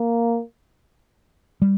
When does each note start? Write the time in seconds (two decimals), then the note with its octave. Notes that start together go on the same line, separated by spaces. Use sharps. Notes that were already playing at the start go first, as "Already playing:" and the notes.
Already playing: A#3
1.62 G3